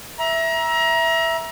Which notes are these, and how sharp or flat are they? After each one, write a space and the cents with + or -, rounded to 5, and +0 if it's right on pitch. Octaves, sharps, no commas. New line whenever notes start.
E5 +0 A#5 +30